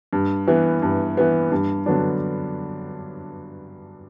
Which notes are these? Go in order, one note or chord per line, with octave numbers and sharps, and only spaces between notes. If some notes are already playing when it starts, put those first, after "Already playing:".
G2
E3 B3
G2
E3 B3
G2
D3 F#3 B3 D4